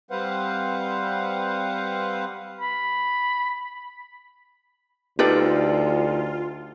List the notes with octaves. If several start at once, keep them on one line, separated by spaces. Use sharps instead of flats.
G3 C4 B4 C5 F5 F#5
B5
D2 D#4 F4 G4 A4 B4 D5